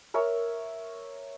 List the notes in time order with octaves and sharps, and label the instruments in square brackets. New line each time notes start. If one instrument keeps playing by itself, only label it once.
[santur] A#4 C#5 E5